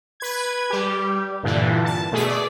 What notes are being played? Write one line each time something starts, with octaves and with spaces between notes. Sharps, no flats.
B4 G#6
G3 G4
G2 A#2 D3 E3
A5
B2 A3 G#4 B6
D5